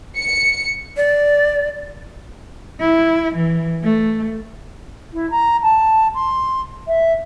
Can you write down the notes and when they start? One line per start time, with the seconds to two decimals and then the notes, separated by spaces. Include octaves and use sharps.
0.17 C#7
0.97 D5
2.80 E4
3.35 E3
3.83 A3
5.13 E4
5.30 A#5
5.62 A5
6.14 C6
6.87 E5